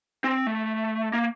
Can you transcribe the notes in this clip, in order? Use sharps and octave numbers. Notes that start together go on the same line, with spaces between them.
C4
A3
A#3